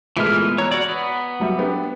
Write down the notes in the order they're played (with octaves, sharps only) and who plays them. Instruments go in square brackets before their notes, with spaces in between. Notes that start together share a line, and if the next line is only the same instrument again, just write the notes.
[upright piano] A#2 G#3 A3 [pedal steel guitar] E3 B3 F6
[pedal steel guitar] C#5 [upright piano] A#5 E6 F#6
[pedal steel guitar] F#4 D5
B3
[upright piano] F#3 G3 E5
B3 D4 G4